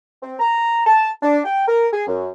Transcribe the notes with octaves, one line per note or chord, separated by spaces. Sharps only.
C4
A#5
A5
D4
G5
A#4
G#4
F#2